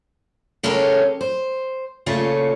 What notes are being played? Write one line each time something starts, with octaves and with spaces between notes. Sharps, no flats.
C#3 G#3 C#4 G4 A4 A#4
C5
A#2 C#3 A3 F4 C#5